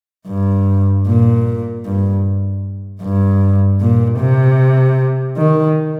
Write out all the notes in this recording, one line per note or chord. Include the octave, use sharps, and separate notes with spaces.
G2
A#2
G2
G2
A#2
C3
D#3